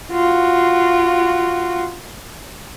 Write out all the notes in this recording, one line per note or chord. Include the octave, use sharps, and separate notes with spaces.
F4 F#4